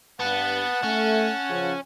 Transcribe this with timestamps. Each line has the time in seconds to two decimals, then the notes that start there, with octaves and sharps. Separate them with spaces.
0.20 G2 B3 F#5 A5
0.83 A3 C#4
1.50 C#3 F3